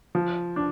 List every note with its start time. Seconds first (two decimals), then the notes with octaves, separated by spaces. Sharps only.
0.15 F3
0.56 D4